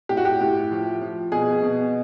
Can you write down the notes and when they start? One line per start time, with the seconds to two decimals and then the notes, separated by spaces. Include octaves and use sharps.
0.09 A2 G4
0.17 F#4
0.25 G4
0.41 A2
0.71 F3
1.01 F3
1.32 B2 G#4
1.63 B2